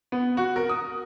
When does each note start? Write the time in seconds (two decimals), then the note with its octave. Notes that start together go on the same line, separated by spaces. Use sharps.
0.12 B3
0.37 F#4
0.56 A#4
0.69 D#6